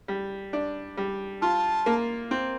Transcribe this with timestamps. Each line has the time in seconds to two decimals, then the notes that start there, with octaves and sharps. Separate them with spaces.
0.08 G3
0.53 D4
0.97 G3
1.41 F4 A5
1.86 A#3
2.31 C4